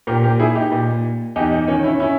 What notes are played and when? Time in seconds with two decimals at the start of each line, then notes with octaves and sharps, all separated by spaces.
0.07 A#2 G4 A#4
0.23 G4 A#4
0.39 E4 G#4
0.55 D#4 G4
0.71 A#2
1.36 E2 D#4 G4
1.52 D#4
1.68 D#3 C#4
1.84 C#4 E4
2.00 C#4 E4